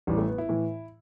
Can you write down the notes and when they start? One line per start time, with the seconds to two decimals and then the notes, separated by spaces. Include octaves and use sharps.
0.07 A1 A2 E3 G3
0.18 A3
0.28 B3
0.38 E4
0.49 A2 E3